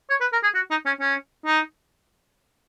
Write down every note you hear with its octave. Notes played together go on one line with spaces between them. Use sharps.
C#5
B4
A#4
G#4
F#4
D#4
C#4
C#4
D#4